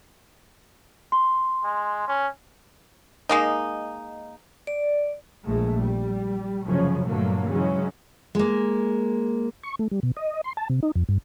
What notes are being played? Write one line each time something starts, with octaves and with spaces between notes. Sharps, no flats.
C6
G#3
C#4
G#3 A#3 D#4
D5
A#1 G#3 A3
G3
F1 F#2 C#3 F3 C#4
G2 A#2 D3 F#3 A3 A#3
C#3 E3 F#3 G#3 C#4
G#3 A#3
C#6
A3
G3
B2
D#5
C6
A5
C3
D#4
F2
G2